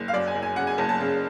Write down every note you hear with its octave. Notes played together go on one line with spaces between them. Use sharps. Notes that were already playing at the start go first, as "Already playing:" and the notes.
Already playing: F#1
F5
F#2 D5
G#5
F#1
G#5
C#3 F#5
G#5
F#1 A5
A5
C#3